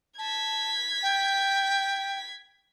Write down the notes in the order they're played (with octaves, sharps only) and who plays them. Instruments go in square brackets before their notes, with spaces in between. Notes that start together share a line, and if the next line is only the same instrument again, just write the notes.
[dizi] A5 [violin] G#6 B6
[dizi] G5